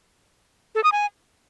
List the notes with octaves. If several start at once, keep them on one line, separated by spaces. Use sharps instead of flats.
A4
D#6
G#5